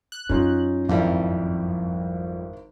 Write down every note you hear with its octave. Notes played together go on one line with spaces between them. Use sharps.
F#6
F#2 C#4 D#4 F4
G#1 F2 G3 E4